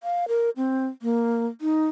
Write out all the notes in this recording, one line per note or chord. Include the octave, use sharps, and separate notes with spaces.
F5
A#4
C4
A#3
D#4